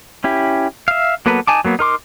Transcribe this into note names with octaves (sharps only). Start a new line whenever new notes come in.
C#4 E4 G4
E5 F5
F#3 A#3 B3 A4 B4
D#4 G#5 A5 D6
F#3 A#3 B3
D#4 A#4 C6 D6